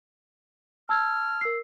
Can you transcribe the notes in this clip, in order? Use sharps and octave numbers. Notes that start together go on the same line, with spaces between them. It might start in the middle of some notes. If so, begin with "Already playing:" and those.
A5 E6 F6 G#6
A#4 E6 C7